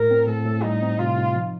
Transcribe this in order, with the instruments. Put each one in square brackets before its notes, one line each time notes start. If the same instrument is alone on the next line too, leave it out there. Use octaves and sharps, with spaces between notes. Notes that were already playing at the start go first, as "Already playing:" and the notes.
Already playing: [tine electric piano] A2 [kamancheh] A#4
[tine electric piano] C4
[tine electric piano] A2 [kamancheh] A4
[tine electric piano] A2
[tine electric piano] G3 [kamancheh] D#4
[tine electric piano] C4
[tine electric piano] C3 [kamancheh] F4
[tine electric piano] D#4
F3